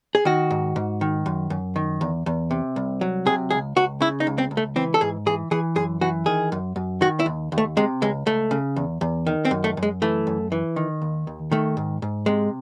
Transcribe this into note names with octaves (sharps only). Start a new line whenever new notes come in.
G#4
D#3 F#4
G#2
G#2
D#3
F#2
F#2
D#3
E2
E2
C3
C2
F#3
C3 G#4
C#2 G#4
C#2 F#4
C#3 E4
D#4
C#2
C4
C#2
A3
E3 C4
A4
G#2 G#4
E3 G#4
E3 G#4
F#2 G#4
E3 F#4
D#3 G#4
F#2
F#2
D#3 F#4
E4
D#2
D#2
A3
C3 G#3
C#2 G#3
C#2 A3
C#3
E2
E2
D#3
C4
F#2
A3
F#2
G#3
E3 A3
F#2
E3
D#3
D#2
D#2
D#3 A3
G#2
G#2
C3 G#3